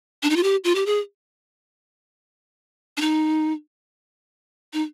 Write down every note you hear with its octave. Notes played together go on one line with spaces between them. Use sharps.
D4
D#4
F4
G4
F4
G4
G#4
D4
D#4
D#4